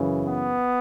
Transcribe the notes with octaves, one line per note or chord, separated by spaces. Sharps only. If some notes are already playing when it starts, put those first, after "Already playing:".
Already playing: F#2 C#3 E3
B3